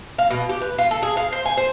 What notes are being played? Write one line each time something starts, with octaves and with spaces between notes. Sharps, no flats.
F5
B2
G4
B4
F4
A4
G#4
F5
C5
G#5
C5